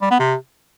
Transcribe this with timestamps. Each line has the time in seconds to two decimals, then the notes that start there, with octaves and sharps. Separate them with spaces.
0.02 G3
0.11 B3
0.19 C3